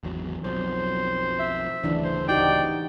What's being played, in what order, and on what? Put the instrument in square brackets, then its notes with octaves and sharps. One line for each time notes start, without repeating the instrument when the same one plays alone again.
[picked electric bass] G#1 E2 F#3
[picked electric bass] B1 F2 [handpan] F#3 [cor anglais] C5
[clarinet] E5
[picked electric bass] D1 A1 C#3 [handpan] E3 D4
[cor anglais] C5
[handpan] D#4 F#4 G4 [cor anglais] D5 [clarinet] G5